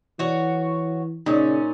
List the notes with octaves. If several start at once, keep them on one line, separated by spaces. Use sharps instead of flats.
E3 F#4 C#5
A#2 C#3 C#4 D#4